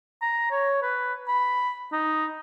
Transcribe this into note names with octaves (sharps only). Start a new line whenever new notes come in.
A#5
C#5
B4
B5
D#4